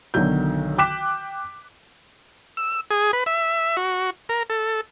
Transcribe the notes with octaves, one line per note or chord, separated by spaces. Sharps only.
B1 D3 D#3 F#3 G6
G5 D6 F#6 B6 E7
E6
G#4
B4
E5
F#4
A#4
A4